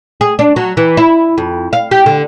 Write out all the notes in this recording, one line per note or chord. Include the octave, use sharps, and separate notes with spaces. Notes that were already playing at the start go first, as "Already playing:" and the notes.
G#4
D4
F#3
E3
E4
F2
F5
G4
D3